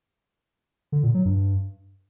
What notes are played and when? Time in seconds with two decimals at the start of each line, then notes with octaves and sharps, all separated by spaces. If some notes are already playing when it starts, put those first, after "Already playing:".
0.92 D3
1.03 A#2
1.14 F#3
1.25 G2